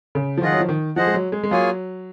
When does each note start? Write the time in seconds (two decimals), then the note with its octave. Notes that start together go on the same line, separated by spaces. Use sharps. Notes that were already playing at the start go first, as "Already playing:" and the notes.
0.15 C#3
0.38 F3
0.42 D#3 F4 G#4 D#5 F#5
0.52 F#3
0.61 F3
0.69 D#3
0.96 F3 G#4 C5 D#5 F#5
1.07 G#3
1.14 F#3
1.32 G#3
1.43 G#3
1.51 F#3 A#3 F4 G#4 C#5 G#5